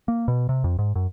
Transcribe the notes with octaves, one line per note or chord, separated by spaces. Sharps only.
A#3
B2
C3
F2
G#2
F#2